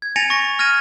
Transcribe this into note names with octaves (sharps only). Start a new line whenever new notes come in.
G#6
G#5 A6 A#6 C#7 D#7 F7
C#6 A#6
F6 G#6 A#6 D#7